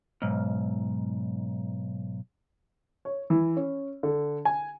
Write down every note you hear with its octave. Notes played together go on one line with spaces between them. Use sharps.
B1 G#2
C#5
E3
C#4
D3
G#5